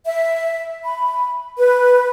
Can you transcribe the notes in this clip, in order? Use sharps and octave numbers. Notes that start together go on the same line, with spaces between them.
E5
B5
B4